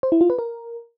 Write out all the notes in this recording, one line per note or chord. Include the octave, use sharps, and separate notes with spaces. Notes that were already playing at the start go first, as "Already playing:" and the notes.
C5
E4
F4
B4
A#4